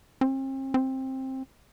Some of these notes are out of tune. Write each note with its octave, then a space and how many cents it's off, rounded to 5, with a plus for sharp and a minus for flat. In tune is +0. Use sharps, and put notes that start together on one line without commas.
C4 +40
C4 +15